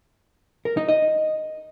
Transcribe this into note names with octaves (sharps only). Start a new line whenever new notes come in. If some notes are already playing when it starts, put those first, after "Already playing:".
A#4
D#4
D#5